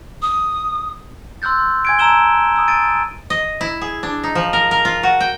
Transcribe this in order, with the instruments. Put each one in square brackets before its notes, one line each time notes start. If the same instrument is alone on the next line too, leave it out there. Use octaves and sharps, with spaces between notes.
[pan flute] D#6
[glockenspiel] C6 E6 F#6 G6 A6
G#5 G#6 D7
A5 A#5 E6 E7 G7
D#6 E6
A6 D7 D#7
[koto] D#5
E4
G#4
D4
D#4
F3
A#4
A#4
F4
F#4
G5